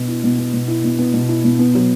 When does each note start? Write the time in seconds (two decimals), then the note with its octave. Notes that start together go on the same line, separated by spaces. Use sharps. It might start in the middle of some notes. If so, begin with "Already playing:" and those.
Already playing: B2 B3
0.08 E4
0.23 B2
0.39 B3
0.53 B2
0.68 E4
0.84 B2
0.99 B3
1.14 B2
1.29 E4
1.44 B2
1.59 B3
1.75 F#3